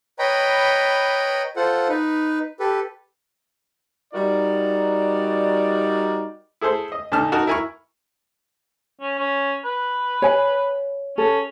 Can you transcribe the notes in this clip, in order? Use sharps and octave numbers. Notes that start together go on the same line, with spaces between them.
B4 C#5 D#5 G5 A#5 B5
F4 A4 C5 F#5
D#4 B4
G4 A4 B4
G3 D#4 F#4 A#4 D5
E4 G#4 A4 C5
D#5
A#2 D3 D#4 A5 F6
D#4 F#4 A#4 A5
E4 A#4 G#5 B5 C#6
C#4
C#4
B4
C#5 G#5
C#4 A4